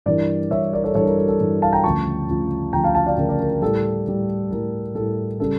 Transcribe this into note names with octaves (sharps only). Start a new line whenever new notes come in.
G2 E3 G3 A#4 D5
G2 E3 G3 C#5 E5
A#4 D5
A4 C#5
G2 E3 G3 A4 C#5
A#4
A4
A4
G2 E3 G3
F5 A5
G5 A#5
D2 C#3 F3 A5 C#6
D2 C#3 F3
D2 C#3 F3 G5 A#5
F5 A5
F5 A5
D5 F5
D2 C#3 F3 A#4
A#4 D5
A#4
A#4
A2 G3 A4
A2 G3
A2 G3 A#4
A2 G3 A4
C#3 G3 A4